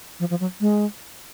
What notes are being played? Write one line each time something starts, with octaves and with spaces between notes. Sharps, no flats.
F3
F3
F#3
G#3